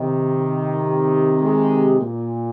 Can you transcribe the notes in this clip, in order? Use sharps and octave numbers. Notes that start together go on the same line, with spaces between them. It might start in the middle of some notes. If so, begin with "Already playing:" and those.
Already playing: C3 D#3
G#3
A#2